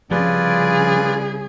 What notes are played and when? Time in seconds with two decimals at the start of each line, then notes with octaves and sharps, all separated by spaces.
0.11 C2 C#3 F3 F4 G#4 B4 D5